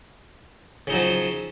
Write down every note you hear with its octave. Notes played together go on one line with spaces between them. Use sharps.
C#3 F3 F#3 D#4